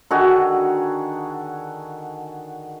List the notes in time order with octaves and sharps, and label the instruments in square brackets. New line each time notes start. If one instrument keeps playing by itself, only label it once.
[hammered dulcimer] D3 D#3 F#4 G#4